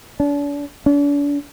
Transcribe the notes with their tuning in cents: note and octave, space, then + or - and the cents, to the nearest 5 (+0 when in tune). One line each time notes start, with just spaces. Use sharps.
D4 -40
D4 -40